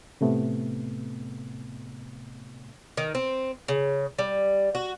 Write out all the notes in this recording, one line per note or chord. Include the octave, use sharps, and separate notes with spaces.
A2 C3 A3 B3
D#3
C4
C#3
G3
F#4